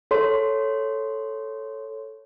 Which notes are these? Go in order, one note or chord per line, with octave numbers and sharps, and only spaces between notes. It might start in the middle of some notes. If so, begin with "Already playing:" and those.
A4 C#5 C6